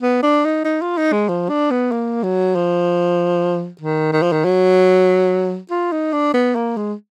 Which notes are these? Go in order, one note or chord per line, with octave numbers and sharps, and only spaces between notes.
B3
D4
D#4
D#4
F4
D#4
G#3
F3
D4
B3
A#3
F#3
F3
D#3
D#3
F3
D#3
F#3
F4
D#4
D4
B3
A#3
G#3